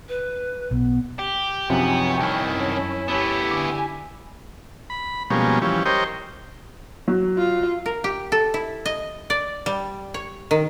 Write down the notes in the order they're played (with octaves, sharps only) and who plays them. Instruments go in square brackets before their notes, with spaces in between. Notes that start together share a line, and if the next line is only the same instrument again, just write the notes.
[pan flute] B4
[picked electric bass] B1 [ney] B3
[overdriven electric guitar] G4
[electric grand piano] F#2 C3 F3 [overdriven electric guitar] B3 [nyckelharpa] D#4 [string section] C#5 G5 G#5
[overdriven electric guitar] C2 D#3 [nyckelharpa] E4 [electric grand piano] A5
[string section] F#2 C#4
[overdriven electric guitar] A3 B3 [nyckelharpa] E4 G4 [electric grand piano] E7
[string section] D3 G#5 [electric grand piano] D6
[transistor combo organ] B5
B2 F3 G3 G#3 A#3 C#4
E3 F3 G3 C#4
G4 A#4 C5 C#5 D#5 G5
[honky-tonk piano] F#3
[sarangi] F4
[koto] A#4
G4
A4
E4
D#5
D5
G3
C#5
D#3